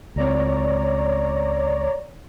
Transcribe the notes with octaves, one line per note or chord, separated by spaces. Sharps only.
C#2 C4 C#5 D5 A#5